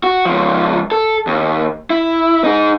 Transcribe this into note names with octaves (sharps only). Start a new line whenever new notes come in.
F#4
C#2 F3
A4
D#2
E4
D#4 G#4